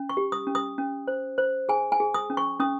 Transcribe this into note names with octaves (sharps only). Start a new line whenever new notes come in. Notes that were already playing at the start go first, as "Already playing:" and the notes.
Already playing: C#4
C#6
G4
D#6
C#4
D#6
C#4
C5
C5
G#4 G#5
G#5
G#4
D#6
C#4
C#6
C#4 D#6